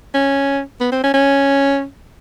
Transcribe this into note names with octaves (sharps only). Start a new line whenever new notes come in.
C#4
B3
C4
C#4
C#4